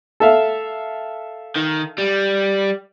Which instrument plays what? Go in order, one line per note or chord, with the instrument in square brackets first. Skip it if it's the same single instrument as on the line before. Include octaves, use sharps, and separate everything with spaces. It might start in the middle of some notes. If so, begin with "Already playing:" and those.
[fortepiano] A4 E5 F5
[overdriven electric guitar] D#3
G3